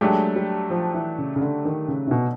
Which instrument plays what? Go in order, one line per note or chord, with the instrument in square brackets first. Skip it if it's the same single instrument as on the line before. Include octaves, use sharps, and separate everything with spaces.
[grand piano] F#3 A3 D4 G4 [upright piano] G#3
[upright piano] G3
F3
E3
C#3
C#3
D3
D#3
C#3
C3
B2